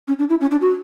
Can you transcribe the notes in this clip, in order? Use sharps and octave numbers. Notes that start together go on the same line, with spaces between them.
C#4
D4
E4
C#4
D4
F#4